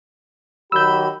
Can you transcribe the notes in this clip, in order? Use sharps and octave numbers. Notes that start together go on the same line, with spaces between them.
D#3 F#3 G4 B5 E6 G6